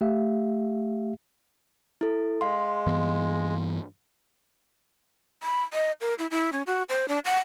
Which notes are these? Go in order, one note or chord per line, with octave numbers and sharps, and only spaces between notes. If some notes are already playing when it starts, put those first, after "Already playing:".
A3 G4 E5 F5
E4 A4
G#3 F5 C6
G2 E3 B3
B5
D#5
A#4
E4
E4
C#4
F#4
C5
D4
F#5